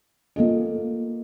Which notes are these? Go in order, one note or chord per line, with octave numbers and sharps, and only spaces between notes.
A#3 F4 A4 D#5